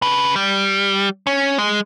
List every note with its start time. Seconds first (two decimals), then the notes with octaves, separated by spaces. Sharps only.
0.02 C#3 B4
0.36 G3
1.27 C#4
1.58 G#3